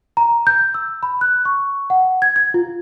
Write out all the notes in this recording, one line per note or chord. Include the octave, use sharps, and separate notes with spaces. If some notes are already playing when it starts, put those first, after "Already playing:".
A#5
G6
E6
B5
F#6
C#6
F#5
G#6
G#6
F4